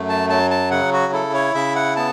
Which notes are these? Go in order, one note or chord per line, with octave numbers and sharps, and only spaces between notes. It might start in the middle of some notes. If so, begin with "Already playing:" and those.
Already playing: F#2 A3
A5
F#3 A5
A5
C#3 F#5
F#4
E4 A4
C#5
C#3 E5
F#5
B3 A5